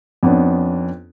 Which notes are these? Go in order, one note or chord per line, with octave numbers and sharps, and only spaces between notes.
F2 B3 C#4 D4